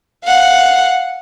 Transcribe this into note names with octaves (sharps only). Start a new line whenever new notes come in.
F5 F#5